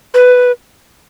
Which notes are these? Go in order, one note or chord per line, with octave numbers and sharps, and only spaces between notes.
B4